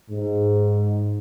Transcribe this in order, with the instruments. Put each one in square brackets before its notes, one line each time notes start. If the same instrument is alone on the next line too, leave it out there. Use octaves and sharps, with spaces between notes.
[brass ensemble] G#2